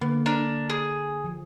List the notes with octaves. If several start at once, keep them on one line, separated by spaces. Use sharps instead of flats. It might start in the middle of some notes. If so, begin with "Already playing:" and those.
D3 A#3 B3
D4 A#4
G#4
F3